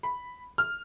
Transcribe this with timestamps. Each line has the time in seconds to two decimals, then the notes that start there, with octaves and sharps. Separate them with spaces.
0.03 B5
0.58 F6